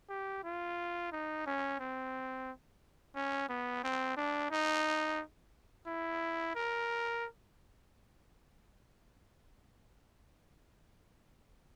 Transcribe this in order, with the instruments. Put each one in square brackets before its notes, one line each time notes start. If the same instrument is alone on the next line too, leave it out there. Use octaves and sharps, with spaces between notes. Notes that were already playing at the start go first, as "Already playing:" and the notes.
[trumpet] G4
F4
D#4
C#4
C4
C#4
B3
C4
D4
D#4
E4
A#4